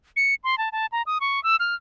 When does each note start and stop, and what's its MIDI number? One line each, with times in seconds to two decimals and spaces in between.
0.16 0.35 97
0.44 0.58 84
0.58 0.69 81
0.72 0.86 81
0.92 1.02 82
1.06 1.18 87
1.21 1.42 85
1.44 1.56 88
1.60 1.75 89